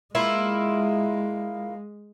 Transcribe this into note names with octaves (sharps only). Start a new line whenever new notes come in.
G#3 A#3 E4 F4